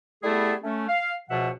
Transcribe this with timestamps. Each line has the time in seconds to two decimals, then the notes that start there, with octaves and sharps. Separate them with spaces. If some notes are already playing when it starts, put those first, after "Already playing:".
0.23 G3 A3 B3 E4 G#4 A4
0.63 A3 C#4
0.88 F5
1.29 C#2 B2 F3 E5 F#5